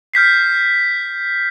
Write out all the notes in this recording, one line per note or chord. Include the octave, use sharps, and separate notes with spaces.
F6 G6 B6 C7